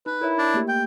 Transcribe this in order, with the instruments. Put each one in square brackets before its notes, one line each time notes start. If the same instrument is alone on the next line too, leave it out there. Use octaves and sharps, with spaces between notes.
[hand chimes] D#4 [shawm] B4
[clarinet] E4 [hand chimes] A#4 C#5 E5
[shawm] D4
[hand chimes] A3 A#3 G4
[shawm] G5